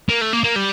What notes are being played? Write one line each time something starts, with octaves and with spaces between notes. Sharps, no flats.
A#3
A3
A#3
A#3
G3